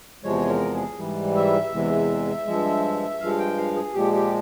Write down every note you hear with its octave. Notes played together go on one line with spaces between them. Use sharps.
E2 C3 F3 G#3 C#5
A#4
G#4
G#2 E3 G3
E5
E2 C3 E3 G#3
G2 F3 G#3
G2 F3 G#3 F5
G5
F5
G#4
A#2 F3 G#3 G4
G4